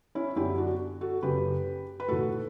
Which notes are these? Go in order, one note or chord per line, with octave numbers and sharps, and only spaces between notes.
C#4 E4
F#2 D3 F#3 B3 E4 G4
D4 F#4
F#4 A4
F#1 F#2 C#3 F#3 G4 B4
B4
B1 A2 E3 A3 F#4 A4